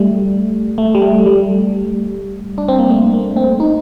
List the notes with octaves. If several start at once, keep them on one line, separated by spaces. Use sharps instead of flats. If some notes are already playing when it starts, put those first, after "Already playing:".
Already playing: G3 A3
A3
G3
A3
G3
D4
C4
A#3
A3
A#3
C4
D#4